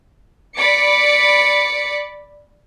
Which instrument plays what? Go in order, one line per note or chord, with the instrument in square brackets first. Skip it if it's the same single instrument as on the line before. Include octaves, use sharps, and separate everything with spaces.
[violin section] D5 B5 D6 C#7